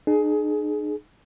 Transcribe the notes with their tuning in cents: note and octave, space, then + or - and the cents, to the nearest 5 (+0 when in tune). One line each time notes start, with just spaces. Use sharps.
D#4 -45 G#4 +20